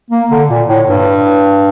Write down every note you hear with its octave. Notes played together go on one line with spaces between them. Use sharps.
A#3
D3
A#2
A2
G2